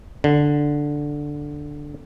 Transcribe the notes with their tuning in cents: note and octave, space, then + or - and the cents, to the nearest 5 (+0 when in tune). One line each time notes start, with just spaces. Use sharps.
D3 +0